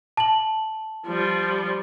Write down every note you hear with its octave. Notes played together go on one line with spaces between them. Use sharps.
A5 F#7
F3 G3